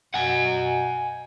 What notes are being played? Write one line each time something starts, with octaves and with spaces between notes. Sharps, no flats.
B2 F#5 G#5